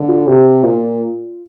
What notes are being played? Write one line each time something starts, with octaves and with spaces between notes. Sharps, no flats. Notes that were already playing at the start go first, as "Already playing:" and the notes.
Already playing: D3
F4
C3 G4
A#2 F4